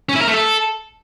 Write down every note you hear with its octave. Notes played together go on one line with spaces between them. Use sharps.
C#4
E4
A#4
A3
A4